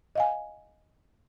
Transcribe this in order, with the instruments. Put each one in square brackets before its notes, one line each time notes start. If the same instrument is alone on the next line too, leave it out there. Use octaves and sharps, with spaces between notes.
[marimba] D#5 F5 G#5